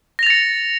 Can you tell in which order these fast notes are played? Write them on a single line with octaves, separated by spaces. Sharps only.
A#6 F7 A6 C#7